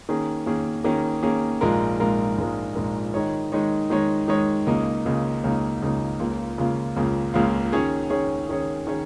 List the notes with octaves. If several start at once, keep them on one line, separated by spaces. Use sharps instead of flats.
D#3 A#3 C#4 G#4
D#3 A#3 C#4 G#4
D#3 A#3 C#4 G#4
D#3 A#3 C#4 G#4
A#1 G#2 G#3 F4 A#4
A#1 G#2 G#3 F4 A#4
A#1 G#2 G#3 F4 A#4
A#1 G#2 G#3 F4 A#4
D#3 G#3 D#4 C#5
D#3 G#3 D#4 C#5
D#3 G#3 D#4 C#5
D#3 G#3 D#4 C#5
C#2 C#3 A#3 D#4
C#2 C#3 A#3 D#4
C#2 C#3 A#3 D#4
C#2 C#3 A#3 D#4
C#2 C#3 A#3 F4
C#2 C#3 A#3 F4
C#2 C#3 A#3 F4
C#2 C#3 A#3 F4
D#3 C#4 G#4 C#5
D#3 C#4 G#4 C#5
D#3 C#4 G#4 C#5
D#3 C#4 G#4 C#5